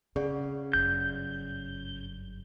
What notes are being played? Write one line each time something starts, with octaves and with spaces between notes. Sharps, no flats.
C#3 C4 G#4 D5 F#5
G1 F#2 G6